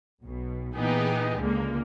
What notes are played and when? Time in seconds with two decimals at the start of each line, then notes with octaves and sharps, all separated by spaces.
0.22 B1 B2
0.75 A#2 E3 B3 D#4 G4 G#4
1.37 C#2 D3 G#3 A#3